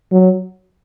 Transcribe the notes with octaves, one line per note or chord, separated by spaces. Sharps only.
F#3